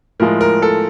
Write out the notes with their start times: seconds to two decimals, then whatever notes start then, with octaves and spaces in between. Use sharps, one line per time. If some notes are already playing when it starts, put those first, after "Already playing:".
0.20 A2 F3 G#3 A#4
0.41 A#4
0.62 A4